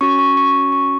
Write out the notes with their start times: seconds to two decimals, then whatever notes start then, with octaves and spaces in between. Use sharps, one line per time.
0.01 C#4 F#4 C#6
0.19 C#6
0.37 C#6
0.55 C#6
0.72 C#6